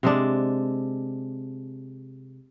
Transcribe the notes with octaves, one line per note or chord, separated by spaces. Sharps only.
C3 G#3 D4